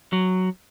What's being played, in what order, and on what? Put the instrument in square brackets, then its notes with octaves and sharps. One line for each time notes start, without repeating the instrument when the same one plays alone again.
[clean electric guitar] F#3